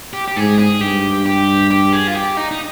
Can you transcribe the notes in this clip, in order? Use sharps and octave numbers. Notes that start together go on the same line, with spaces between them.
G4
G4
G#2 G#4
G#4
G2 G4
G4
G4
G#4
F4
G4
D#4
D#4